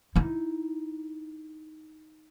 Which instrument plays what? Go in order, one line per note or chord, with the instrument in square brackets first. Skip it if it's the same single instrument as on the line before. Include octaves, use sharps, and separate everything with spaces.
[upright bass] D#4 E4